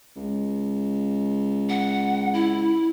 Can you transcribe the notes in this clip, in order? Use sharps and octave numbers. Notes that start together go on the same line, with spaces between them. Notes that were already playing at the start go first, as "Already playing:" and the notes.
C#2
F#5
E4